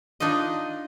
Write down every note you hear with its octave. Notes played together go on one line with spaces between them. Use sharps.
D4 D#4 F4 D#5